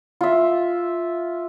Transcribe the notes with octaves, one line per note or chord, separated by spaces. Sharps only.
F4 E5